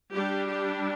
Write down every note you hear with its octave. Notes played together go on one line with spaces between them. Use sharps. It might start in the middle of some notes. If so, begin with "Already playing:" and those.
G3 D4 G4
G4